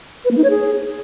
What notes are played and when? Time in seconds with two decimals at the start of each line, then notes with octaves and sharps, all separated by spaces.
0.25 B4
0.31 A#3
0.37 D#4
0.44 C#5
0.50 G#4